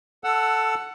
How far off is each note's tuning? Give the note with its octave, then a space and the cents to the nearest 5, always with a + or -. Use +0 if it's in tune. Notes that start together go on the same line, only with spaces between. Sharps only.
A4 +0 F#5 +0 E6 +20